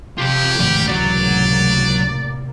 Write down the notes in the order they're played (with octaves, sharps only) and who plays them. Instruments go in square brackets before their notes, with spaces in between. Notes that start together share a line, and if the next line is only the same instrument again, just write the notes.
[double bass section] C3 [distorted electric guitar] F4 A4 [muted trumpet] G4
[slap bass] G#1 F3 [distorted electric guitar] A3 D5
[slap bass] C#2 E3 [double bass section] A2 C3 A#3 [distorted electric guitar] F#3 [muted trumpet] D5